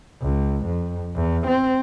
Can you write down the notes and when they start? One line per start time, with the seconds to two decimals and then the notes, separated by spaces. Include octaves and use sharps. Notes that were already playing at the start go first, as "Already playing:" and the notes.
0.22 C#2
0.66 F2
1.16 E2
1.47 C4